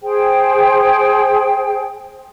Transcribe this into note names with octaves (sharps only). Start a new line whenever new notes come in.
G#4 C5 G5